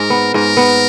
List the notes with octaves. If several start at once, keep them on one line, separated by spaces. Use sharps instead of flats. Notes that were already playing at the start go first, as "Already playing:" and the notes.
Already playing: G#2 G#4 A#4
B3
G#2 A#4
B3